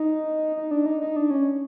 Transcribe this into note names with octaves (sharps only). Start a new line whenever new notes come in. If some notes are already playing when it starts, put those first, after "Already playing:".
Already playing: D#4
D#4
D4
D#4
D#4
D4
C#4